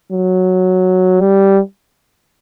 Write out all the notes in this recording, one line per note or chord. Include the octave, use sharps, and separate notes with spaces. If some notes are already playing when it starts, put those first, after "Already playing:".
F#3
G3